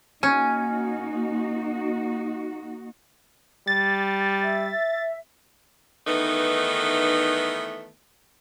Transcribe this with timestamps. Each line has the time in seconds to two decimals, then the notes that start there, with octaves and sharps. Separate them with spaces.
0.23 A#3 C#4 D#4 F#4 G#5
3.67 G3 A6
4.43 E5
6.06 D#3 E3 A3 B3 D#4